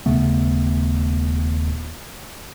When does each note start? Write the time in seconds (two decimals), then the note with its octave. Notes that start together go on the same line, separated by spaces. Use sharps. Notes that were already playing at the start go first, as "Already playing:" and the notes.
0.06 D#1 C#3 A3 B3